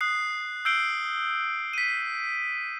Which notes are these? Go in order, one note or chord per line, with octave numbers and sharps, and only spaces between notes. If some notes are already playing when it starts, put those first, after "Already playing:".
D#6 F#6 C7
E6 G6 C7 D7 F#7 G7
B6 D#7